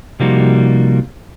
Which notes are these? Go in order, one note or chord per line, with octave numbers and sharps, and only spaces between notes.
C3 F3 G3 A#3 D#4 F#4